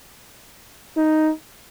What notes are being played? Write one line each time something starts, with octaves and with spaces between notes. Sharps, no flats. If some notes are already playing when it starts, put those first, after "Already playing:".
D#4